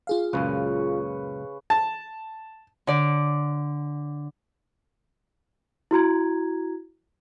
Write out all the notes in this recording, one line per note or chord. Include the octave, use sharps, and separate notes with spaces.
F4 G#4 F5
C#2 F#2 A#2 C#3 B4 C#5
A5
D3 D5
E4 F#4 A#5 G#6